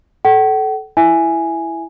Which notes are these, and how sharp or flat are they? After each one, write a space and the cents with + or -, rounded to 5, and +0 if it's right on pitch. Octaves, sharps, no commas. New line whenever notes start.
A4 -20 F#5 +45
E4 +10 E5 +10 G#5 +0